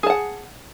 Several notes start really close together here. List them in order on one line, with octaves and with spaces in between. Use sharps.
G#4 A5 F#5